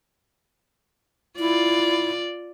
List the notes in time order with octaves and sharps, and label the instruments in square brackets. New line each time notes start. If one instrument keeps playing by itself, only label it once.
[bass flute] E4 [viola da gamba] F4 D5